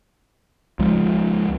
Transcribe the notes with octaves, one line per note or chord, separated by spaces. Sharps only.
C#2 F3 G#3